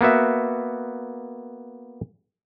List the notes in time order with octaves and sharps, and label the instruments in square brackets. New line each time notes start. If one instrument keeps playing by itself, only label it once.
[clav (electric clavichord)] A#3 B3 F#4 E5